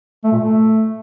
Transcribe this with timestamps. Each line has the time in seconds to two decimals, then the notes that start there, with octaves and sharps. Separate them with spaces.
0.24 A3
0.32 A#2
0.40 A3